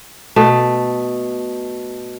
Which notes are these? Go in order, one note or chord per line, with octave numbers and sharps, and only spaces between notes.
B2 A3